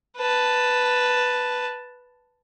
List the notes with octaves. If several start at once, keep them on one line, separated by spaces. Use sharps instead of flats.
B4 A5